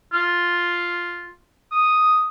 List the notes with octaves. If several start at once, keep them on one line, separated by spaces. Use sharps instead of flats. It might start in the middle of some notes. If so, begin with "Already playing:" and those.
F4
D#6